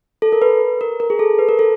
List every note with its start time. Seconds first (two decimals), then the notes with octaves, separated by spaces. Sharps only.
0.22 A4
0.32 A#4
0.42 B4
0.81 A#4
1.00 A#4
1.10 G#4
1.19 A4
1.39 B4
1.49 A#4
1.59 A4